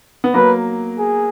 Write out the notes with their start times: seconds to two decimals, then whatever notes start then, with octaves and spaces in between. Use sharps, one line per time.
0.24 B3
0.34 F#3 A#3 B4
0.98 G#4